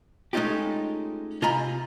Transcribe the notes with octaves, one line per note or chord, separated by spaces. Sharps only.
G#3 A3 C#4 D#4 F4 G4
C3 F4 D#5 G#5 A#5 B5